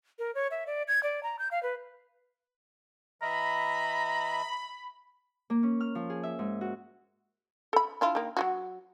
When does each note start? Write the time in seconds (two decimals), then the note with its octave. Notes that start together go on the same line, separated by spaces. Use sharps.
0.19 A#4
0.35 C#5
0.51 E5
0.67 D5
0.88 G#6
1.03 D5
1.23 A#5
1.39 G6
1.51 F5
1.63 B4
3.22 E3 D#5 E5 A#5 B5
5.50 A#3
5.63 C#4
5.81 F6
5.95 F3
6.10 G#4
6.23 E5
6.39 G#2
6.61 F#4
7.73 A4 B5
8.01 D4 E4 F4
8.15 D#3 A#3
8.37 F#3 F4 F#4